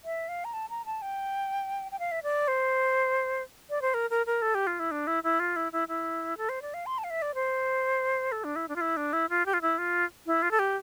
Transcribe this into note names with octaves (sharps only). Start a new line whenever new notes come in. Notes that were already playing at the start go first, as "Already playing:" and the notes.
E5
F5
A#5
A5
A#5
A5
G5
G5
F5
E5
D5
C5
D5
C5
A#4
A#4
A#4
A4
G4
F4
E4
D4
E4
E4
F4
E4
E4
E4
A4
C5
D5
F5
C6
A5
F5
E5
D5
C5
A4
D4
E4
D4
F4
E4
D4
E4
F4
G4
F4
E4
F4
E4
F4
A4
G4